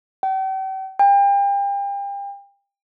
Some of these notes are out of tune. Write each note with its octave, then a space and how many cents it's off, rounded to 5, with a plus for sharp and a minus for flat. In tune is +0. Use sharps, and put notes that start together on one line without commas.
G5 -40
G5 +35